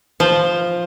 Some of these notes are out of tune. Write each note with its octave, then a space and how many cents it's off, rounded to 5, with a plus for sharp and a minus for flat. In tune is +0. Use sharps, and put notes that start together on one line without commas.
F3 +0 C5 +0